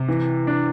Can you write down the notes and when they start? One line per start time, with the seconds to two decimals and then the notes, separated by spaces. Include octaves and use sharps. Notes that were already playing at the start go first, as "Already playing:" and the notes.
Already playing: C3
0.09 E3
0.47 D4